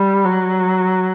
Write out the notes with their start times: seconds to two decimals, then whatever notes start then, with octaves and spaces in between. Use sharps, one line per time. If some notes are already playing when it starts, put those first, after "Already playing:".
Already playing: G3
0.24 F#3